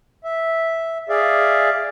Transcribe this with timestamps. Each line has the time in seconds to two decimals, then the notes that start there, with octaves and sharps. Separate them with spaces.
0.24 E5
1.09 G#4 D5 E5 F5